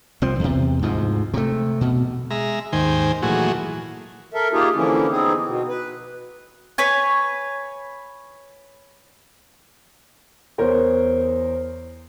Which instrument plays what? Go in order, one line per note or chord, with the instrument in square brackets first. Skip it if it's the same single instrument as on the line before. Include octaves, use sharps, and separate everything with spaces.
[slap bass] C2 F3 C4
E2 C3
D2 G#2 F3
C3 A3
B2
[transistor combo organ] G#3 E5 A#5
D#2 G#2 D#3 C5 G5 G#5
A#2 E3 F#3 A3 F#4 G#4
[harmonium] A4 A#4 E5
A#3 D#4 F4 G4 G#4
D3 E3 F3 A#3 C#4 E4
B3 C4 D#4 G#4
B2
B4
[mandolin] B4 C#5 G#5
[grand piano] E2 A#4 C5 C#5